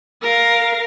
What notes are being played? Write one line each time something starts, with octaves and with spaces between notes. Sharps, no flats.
A#4 F5